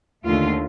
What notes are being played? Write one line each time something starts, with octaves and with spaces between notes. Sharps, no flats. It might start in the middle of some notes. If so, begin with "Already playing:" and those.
D#2 D3 A3 F4